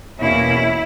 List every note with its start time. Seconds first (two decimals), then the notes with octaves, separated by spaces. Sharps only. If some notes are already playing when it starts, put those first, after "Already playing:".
0.19 E2 B2 A#3 C#4 E4